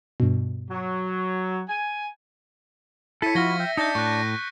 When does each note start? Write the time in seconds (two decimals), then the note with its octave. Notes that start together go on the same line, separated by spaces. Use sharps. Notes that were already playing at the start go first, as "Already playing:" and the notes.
0.20 G2 B2
0.69 F#3
1.68 G#5
3.22 E4 A4 C#5 A5 B6 C#7 D#7
3.35 F3 F4 F#4 G#6 A#6 G7
3.60 E5 G5
3.77 D4 D#4 A5 G6 A#6 C#7
3.95 A2 C#6 F#6 A#6